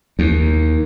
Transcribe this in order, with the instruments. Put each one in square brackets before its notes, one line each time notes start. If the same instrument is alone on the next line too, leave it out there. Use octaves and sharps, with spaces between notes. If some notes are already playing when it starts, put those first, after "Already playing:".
[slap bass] D#2